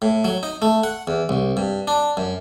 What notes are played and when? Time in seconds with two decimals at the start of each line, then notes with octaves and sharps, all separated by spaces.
0.02 A2
0.24 F#3
0.43 D#4
0.62 A3
0.84 F#5
1.07 E2
1.29 C2
1.57 G2
1.87 D4
2.17 F#2